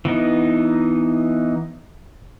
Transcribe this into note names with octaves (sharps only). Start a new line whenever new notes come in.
E3 B3 D#4